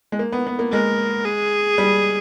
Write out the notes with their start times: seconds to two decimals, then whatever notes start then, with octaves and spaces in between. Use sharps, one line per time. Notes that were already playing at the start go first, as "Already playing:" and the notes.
0.12 G#3
0.19 A#3
0.32 B3
0.47 B3
0.59 A#3
0.72 G#3 A#4
1.25 G#4
1.78 G3